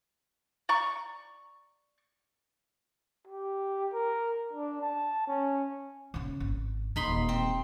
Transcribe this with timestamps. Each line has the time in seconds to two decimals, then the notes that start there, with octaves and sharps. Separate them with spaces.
0.69 D5 A#5 C#6
3.28 G4
3.93 A#4
4.53 D4
4.81 A5
5.28 C#4
6.14 C#3 C#4
6.40 G#1
6.96 D#1 A1 D#4 B5 C6
7.29 C4